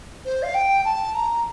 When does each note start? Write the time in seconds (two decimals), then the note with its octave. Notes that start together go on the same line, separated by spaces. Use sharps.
0.24 C5
0.42 F5
0.54 G5
0.84 A5
1.14 A#5